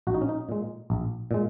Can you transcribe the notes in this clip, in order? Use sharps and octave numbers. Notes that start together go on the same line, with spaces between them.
A#1 F#4
D#4
C#4
D#4
A#2 G#3
A#1
A#2 G#3